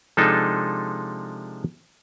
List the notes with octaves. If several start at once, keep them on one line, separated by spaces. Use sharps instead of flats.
C3 F3 G#3 D4 D#4 A4